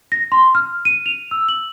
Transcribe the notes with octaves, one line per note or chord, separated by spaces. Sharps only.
A#6
C6
F6
D#7
F7
E6
F#7